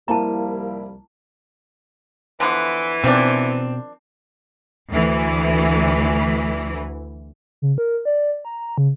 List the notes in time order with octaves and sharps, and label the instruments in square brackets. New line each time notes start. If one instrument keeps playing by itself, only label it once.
[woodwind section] C2 F3 G3 [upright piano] A#3 E4 [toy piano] A5 A#5
[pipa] D3 F3 B3 [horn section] E3
[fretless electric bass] B2 [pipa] D#3 F3 D4 [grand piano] C4
[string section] D2 E3
[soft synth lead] C#3
A#4
D5
A#5
C#3